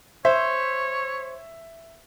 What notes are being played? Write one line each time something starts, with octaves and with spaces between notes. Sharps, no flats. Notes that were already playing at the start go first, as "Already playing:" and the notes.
C5 C#5 E5